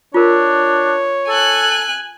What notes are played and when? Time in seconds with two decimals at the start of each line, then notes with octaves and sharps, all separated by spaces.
0.14 D4 F4 A#4 C#5
1.28 A4 G#5 F#6